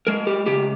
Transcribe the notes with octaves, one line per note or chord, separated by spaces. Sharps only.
G#3 A#4
G4
C#3 G4